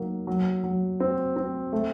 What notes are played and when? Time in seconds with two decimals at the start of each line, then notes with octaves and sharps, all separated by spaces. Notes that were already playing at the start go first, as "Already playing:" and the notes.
Already playing: F#3 A#3 D#4
0.27 F#3
0.64 F#3
1.00 C4
1.36 C4
1.73 A3